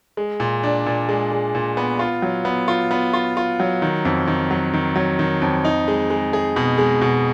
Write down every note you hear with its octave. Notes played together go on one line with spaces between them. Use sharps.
G#3
A#2
D4
A#2
G#3
G#3
A#2
B3
F4
F#3
B3
F4
B3
F4
F4
F#3
D#3
F2
D#3
F#3
D#3
F#3
D#3
F2
D#4
G#3
G#3
G#4
B2
G#3
B2